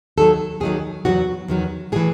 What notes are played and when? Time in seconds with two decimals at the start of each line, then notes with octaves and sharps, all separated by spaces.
0.17 D#2 D#3 F#3 A4
0.60 D#2 D#3 F#3 G#4
1.05 E2 D#3 F#4
1.09 F#3
1.48 E2 D#3 F#3
1.92 A2 E3 G#4